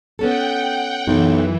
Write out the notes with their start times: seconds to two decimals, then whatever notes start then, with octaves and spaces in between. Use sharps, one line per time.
0.19 B3 C#4 A4 F#5 G5
1.07 B1 F#2 E3